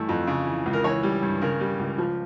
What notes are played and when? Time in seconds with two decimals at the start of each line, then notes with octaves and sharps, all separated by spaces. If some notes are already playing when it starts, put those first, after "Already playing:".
Already playing: G2 E3 A3
0.09 F2
0.27 C#3
0.46 E3
0.66 C#2
0.73 A#4
0.84 E3 C#5
1.03 G3
1.22 G2
1.41 C#3 A#4
1.60 G3
1.79 C#2
1.98 F3